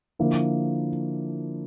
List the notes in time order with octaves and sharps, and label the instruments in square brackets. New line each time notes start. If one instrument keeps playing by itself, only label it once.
[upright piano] D3 F3 A#3 E4